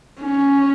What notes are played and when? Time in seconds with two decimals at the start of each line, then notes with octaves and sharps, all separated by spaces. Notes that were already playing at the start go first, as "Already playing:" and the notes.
0.21 C#4